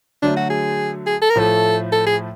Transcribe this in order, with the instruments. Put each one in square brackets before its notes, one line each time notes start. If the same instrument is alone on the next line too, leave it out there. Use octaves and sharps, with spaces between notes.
[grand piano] D3 F#3 A3 [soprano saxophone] D4
[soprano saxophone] F#4
G#4
G#4
A4
A#4
[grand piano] A2 F3 A3 [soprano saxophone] A4
[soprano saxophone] A4
G#4